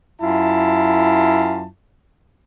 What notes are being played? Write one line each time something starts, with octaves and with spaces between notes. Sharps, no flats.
F#2 E4 F4 A5